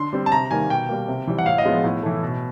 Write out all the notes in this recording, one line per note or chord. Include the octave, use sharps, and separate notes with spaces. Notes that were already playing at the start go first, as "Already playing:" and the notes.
Already playing: D3 C6
G3 C4
A5
C3 A#5
D#3 G3 A#3 G#5
B2 G5
G3 A#3
C3
E3 G3
F#5
A2 F5
D#5
F3 G#3 B3
A2
E3 A3
B2